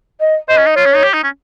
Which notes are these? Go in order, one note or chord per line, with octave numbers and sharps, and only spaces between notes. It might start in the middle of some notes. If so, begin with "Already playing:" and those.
D#5
C5 D#5
C#4
D#4
F4 C#5
C#4
D#4
G4
D#4
C#4